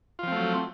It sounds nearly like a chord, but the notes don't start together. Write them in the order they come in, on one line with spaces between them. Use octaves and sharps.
F4 F3 C4 A3 F#3